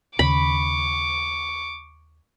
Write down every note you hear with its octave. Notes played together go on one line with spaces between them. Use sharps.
D#2 C#3 B5 C#6 D6